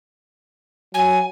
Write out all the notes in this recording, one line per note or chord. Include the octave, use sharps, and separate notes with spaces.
F#3 G#5